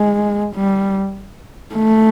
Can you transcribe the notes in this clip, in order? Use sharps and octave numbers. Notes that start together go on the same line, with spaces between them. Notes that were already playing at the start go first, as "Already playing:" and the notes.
Already playing: G#3
G3
A3